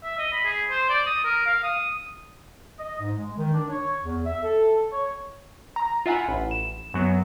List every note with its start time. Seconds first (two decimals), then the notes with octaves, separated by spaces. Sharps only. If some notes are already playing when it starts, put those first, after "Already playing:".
0.04 E5
0.18 D#5
0.33 B5
0.45 G#4
0.70 C5
0.90 D5
1.06 D#6
1.25 A#4
1.46 F5
1.64 D#6
2.79 D#5
3.00 G#2
3.16 G#3
3.37 D#3
3.54 D4
3.70 C#5
4.03 E2
4.26 E5
4.43 A4
4.92 C#5
5.76 A#5
6.06 F4 E5 F#5 G#5 B5
6.28 A1
6.51 E7
6.94 F#2 F#3 B3